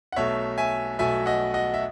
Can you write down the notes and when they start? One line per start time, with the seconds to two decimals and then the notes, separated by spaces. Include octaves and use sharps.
0.12 F#5
0.16 B1 B2 F#3 A3 C#5 E5
0.58 E5 G#5
0.99 B1 B2 F#3 A3 E5 G#5
1.26 D#5 F#5
1.54 D#5 F#5
1.74 E5